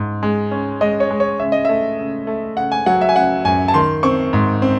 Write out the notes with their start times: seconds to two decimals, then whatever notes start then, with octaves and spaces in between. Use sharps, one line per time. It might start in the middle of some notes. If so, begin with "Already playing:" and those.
Already playing: G#2
0.23 G#3
0.51 C#4
0.81 G#3 D#5
1.00 C#5
1.11 G#3
1.20 C#5
1.39 C#3 E5
1.52 D#5
1.65 A3 E5
1.99 C#3
2.27 A3
2.57 C#3 F#5
2.72 G#5
2.86 F#3 F#5
3.01 E5
3.09 G#5
3.15 C#3 F#5
3.45 F#2 G#5
3.68 A5
3.74 D#3 C6
4.03 C4 C#6
4.33 G#2
4.62 C4